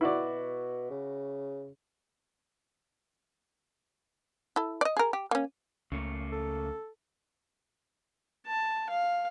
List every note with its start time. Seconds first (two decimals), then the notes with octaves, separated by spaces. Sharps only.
0.01 B2 E4 F#4 D5
0.90 C#3
4.56 E4 A4
4.81 D5 D#5
4.97 G#4 A#4
5.13 G4
5.31 A#3 C#4
5.92 C#2 C#3 A3 A#3
6.32 A4
8.47 A5
8.90 F5